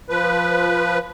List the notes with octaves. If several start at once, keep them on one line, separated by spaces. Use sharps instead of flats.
F3 B4